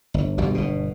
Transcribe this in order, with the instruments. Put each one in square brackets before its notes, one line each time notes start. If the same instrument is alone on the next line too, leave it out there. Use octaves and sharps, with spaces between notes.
[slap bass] G1
G1 B2 G3
G1 B2